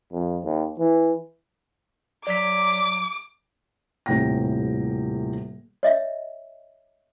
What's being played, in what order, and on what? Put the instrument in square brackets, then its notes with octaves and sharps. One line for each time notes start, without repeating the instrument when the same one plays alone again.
[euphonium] F2
D#2
E3
[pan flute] F#3 [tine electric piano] D5 B6 [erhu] D6
[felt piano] D#1 A2 C3 G5 A#6
[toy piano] C#5 D#5 E5